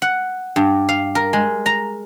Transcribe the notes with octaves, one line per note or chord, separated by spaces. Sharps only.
F#5
G2
F5
A#4
G#3
A#5